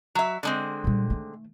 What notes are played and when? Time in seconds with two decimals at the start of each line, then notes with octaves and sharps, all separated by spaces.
0.15 F#3 E5
0.43 D3 G#3 C4
0.84 A#2 G3
1.10 D#3 A3